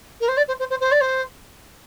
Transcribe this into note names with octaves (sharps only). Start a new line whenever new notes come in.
A#4
C5
D5
C5
C5
C5
C5
D5
C5